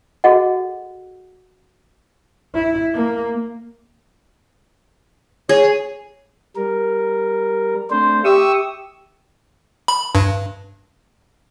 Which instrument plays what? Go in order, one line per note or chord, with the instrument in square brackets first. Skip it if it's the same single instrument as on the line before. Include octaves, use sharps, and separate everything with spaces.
[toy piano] F#4 G#4 A4 D#5 F#5
[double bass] E4
A#3
[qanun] G#4 [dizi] C#5
[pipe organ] G3 A#4
[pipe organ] A3 C4 D4 [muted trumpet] C5
[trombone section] G4 [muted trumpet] E5 [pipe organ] C#6 D#6 E6
[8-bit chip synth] B5
G2